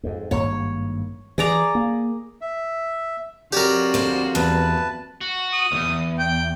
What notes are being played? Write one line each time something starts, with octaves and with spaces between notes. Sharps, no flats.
F2 G#2
G#1 G2 A#3 C#5
E3 G#4 D5 A#5
A#3
E5
F2 F#4 G4 A#4 C#5 D5
D2 C5
E2 B4 A5
F#4
D#6
B1 E2
G5